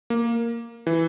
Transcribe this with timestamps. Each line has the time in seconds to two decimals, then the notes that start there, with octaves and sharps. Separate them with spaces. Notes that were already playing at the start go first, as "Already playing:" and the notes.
0.10 A#3
0.87 E3